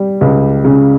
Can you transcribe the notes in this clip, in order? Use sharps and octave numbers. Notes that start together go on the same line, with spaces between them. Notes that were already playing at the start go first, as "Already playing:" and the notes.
Already playing: G3
C#2
C#3